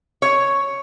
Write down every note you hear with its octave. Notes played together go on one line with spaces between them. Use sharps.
C#5